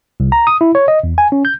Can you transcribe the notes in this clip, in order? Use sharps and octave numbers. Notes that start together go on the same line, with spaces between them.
C2
A#5
D#6
E4
C#5
D#5
E2
G#5
C#4
G6